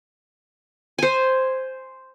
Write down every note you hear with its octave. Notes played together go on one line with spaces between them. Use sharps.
C5 G#5